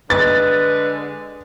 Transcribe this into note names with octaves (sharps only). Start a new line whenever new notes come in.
D3 G#3 B4 A6